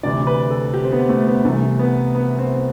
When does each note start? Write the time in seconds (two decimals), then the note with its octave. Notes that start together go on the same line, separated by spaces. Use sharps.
0.03 D2 C3 E3 D5
0.27 B4
0.50 A4
0.74 G4
0.84 C4
0.92 B3
1.09 A3
1.27 B3
1.44 C2 C3 E3 A3
1.79 B3
2.15 B3
2.39 C4